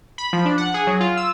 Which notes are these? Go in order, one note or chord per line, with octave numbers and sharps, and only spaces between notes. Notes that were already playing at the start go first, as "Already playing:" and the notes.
B5
F3
D4
F#5
G#4
F#3
F4
E6